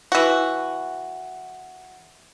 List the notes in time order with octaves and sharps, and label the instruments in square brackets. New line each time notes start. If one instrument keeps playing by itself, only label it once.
[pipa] E3 F#4